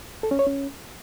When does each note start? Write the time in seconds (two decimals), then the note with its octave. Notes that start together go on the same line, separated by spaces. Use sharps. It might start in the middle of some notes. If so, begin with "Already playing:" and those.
0.23 A4
0.31 C#4
0.39 C#5
0.47 C#4